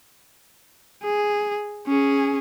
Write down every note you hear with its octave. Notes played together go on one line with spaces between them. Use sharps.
G#4
C#4 G#4